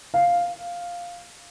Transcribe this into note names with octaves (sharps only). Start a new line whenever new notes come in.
F5